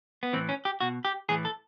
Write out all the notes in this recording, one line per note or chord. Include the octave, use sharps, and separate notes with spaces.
B3
A2 E3 C4
C#4
G4
B2 F#4
G4
A2 E3 G#4
A4